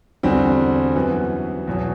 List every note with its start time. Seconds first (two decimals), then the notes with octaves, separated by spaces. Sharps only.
0.23 E2 D3 G3 C4 F#4
0.95 F#2 E3 B3 F#4
1.67 E2 B2 F#3